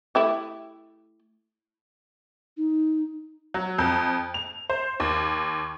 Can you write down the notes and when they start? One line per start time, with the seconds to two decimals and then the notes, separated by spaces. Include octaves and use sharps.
0.15 A3 E4 G4
2.57 D#4
3.54 F#3
3.78 F2
4.34 F7
4.70 C5
5.00 D#2